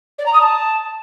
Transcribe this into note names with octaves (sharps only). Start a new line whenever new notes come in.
D5
A#5
D#6
A5